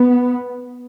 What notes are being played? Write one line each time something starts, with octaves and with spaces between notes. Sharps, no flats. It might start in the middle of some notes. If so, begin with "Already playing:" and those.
Already playing: B3